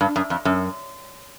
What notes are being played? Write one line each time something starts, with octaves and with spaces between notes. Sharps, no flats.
G2
F#2
F2
F#2